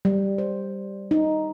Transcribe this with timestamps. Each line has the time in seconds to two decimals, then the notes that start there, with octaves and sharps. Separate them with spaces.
0.05 G3
0.38 C5
1.11 D#4